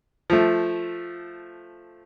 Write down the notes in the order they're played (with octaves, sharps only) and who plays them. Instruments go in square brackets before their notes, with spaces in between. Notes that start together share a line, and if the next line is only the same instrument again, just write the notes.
[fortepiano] F3 A3